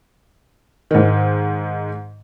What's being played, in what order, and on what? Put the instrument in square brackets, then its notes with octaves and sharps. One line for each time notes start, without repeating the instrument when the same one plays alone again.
[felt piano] G#2 D#3